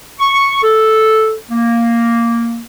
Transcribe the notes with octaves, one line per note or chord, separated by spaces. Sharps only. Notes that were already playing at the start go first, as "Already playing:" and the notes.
C#6
A4
A#3